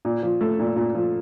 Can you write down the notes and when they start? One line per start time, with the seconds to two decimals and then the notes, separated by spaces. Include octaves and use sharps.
0.05 A#2
0.23 F3
0.41 A3
0.59 A#2
0.76 A#2
0.95 F3